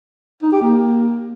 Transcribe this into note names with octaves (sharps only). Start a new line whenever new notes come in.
D#4
G4
A#3